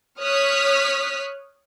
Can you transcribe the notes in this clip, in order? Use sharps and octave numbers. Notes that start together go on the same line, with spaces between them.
C#5 D#6 F6 F#6 B6